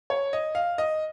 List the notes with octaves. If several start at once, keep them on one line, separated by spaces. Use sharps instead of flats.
C#5
D#5
F5
D#5